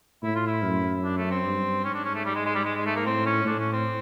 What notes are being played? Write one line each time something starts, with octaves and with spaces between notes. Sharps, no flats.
A2 E4
F4
E4
F#2
D4
A3
C4
G2
G#2 C#4
D4
C#4
A3
G3
G#3
G#3
G3
G#3
G#3
A3
A#3
A2 C4
C#4
A2 D4
C#4
C4